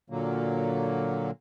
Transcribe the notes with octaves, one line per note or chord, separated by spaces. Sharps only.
A#2 D3 F#3 A#3